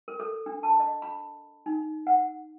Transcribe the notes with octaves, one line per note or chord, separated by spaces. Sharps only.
A#4
A4
D4
A5
D#5
B5
D#4
F#5